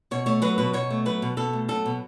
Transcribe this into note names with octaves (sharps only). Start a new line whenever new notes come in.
B2 C#5
A3 C#5
F#3 B4
B2 B4
B2 C#5
A3
F#3 B4
B2
B2 A4
A3
F#3 A4
B2